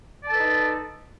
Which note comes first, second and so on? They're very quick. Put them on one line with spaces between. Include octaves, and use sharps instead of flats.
D5 A5 A4 B4 D#4